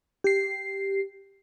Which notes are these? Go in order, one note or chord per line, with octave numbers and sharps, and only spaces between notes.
G4 C7